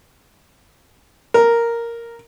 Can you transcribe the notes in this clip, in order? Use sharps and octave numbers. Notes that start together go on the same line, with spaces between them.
A#4